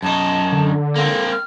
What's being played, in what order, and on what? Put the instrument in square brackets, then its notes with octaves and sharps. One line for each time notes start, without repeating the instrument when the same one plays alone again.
[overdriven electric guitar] F#2 D#4 [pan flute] A5
[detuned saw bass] D3
[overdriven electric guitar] A#3 C4 [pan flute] A4
[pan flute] F6